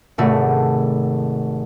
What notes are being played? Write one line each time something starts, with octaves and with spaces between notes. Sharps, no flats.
G#1 C3 A3 F#4